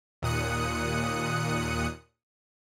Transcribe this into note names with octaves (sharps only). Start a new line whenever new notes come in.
D#2 A#2 D#6 F#6 C#7